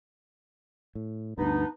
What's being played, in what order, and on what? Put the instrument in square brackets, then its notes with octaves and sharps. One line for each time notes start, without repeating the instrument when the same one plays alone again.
[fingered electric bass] A2
[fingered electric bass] D2 G2 [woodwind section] B3 D4 D#4